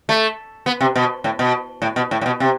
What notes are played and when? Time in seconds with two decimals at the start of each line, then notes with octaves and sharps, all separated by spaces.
0.09 A3
0.66 B3
0.81 C3
0.96 B2
1.24 A2
1.39 B2
1.82 A2
1.96 B2
2.11 A2
2.21 A2
2.26 B2
2.40 C3